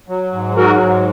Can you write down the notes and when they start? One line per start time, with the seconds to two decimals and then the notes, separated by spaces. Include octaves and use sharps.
0.08 F#3
0.33 G#2
0.57 F#3 F#4 A#4
0.81 G#2